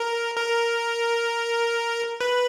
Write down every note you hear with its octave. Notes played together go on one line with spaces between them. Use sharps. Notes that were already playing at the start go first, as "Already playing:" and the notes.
Already playing: A#4
A#4
B4